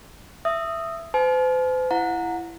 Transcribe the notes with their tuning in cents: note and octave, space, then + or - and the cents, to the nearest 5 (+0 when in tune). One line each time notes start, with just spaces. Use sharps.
E5 +10 D#6 +0
C5 -45 A5 -45
E4 +20 F#5 -25 A#5 -15